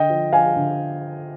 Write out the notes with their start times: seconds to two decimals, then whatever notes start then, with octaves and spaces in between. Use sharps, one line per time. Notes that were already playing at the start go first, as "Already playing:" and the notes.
Already playing: D3 D#5 G5
0.10 F3
0.32 F3 F5 G#5
0.56 D3